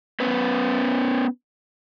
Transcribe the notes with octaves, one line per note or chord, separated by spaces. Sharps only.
B3 C#4 B4